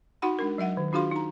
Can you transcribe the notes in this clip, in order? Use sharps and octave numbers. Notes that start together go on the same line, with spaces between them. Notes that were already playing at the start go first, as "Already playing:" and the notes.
D#4 F#4 F#5 B5
G#3 D4 A#4
F#3 D#5 E5 F#5
D#3
D4 F4 F#4 G#4 F5 C6
D#4 A#5